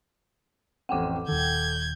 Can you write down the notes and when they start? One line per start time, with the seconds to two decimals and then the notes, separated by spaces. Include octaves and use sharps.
0.89 A1 F2 C4 F#5 G5 D6
1.28 D#1 D#3 A4 G6 G#6